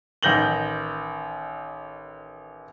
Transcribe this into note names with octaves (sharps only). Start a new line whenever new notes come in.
A1 D#3 G6 A#6 F#7 G7